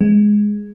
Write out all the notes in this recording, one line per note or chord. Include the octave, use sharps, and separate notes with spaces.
G#3